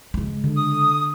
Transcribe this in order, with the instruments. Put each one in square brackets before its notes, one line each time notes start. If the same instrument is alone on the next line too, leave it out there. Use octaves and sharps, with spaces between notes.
[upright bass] C#3 G#3
[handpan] D3
[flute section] D#6